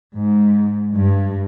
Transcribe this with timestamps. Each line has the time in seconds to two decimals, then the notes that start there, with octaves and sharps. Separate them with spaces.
0.14 G#2
0.94 G2